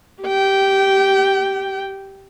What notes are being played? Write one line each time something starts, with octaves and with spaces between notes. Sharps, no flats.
G4 G5